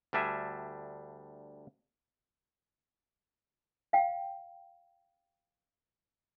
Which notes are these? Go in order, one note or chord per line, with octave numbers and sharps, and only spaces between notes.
D2 G3 D4 E5 G#5
F5 G5